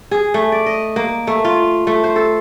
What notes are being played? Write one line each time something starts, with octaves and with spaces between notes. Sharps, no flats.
G#4
A3
D5
D#5
A#3
A3
F4
A3
C5
A4